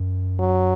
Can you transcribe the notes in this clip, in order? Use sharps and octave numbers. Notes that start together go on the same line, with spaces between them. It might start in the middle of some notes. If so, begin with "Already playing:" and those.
Already playing: F#2
F#3